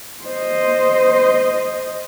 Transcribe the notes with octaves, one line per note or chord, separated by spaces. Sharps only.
C5 D#5